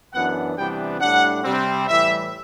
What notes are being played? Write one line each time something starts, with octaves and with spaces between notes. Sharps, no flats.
F#2 E3 B3 D4 F#5
C3 E3 G3 B3 D4 G5
A2 G3 D4 F#5
C3 G3 C4
A2 E3 G3 E5